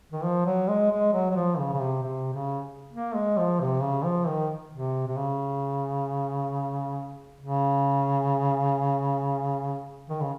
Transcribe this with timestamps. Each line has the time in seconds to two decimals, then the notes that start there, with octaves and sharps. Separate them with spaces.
0.12 D#3
0.24 F3
0.46 F#3
0.68 G#3
0.91 G#3
1.13 F#3
1.31 F#3
1.36 F3
1.58 C#3
1.73 C#3
1.81 C3
2.03 C3
2.33 C#3
2.93 A#3
3.15 G#3
3.37 F3
3.60 C3
3.82 C#3
4.04 F3
4.28 D#3
4.72 C3
5.07 C3
5.17 C#3
7.40 C#3
10.10 D#3
10.21 C#3